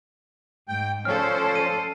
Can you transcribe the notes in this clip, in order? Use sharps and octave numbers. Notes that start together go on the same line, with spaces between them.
G#2 G5
F3 C#4 A4 C5 D5 F6
D#7